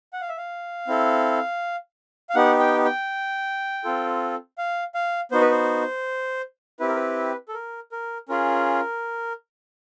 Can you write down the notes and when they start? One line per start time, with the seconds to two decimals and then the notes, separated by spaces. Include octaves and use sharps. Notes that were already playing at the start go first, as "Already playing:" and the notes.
0.13 F#5
0.21 F5
0.29 E5
0.37 F5
0.87 C4 E4 A4
2.29 F5
2.35 B3 D#4 G4 F#5
2.59 G5
2.85 G5
3.84 C4 F4 A4
4.58 F5
4.95 F5
5.31 B3 D#4 F#4 C5
5.41 B4
5.51 C5
6.79 C4 E4 G4 B4
6.88 A#4
6.95 B4
7.48 A4
7.54 A#4
7.92 A#4
8.29 C#4 F4 G#4 A#4